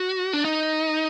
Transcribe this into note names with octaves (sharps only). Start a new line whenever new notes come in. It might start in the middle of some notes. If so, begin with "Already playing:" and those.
Already playing: F#4
D4
D#4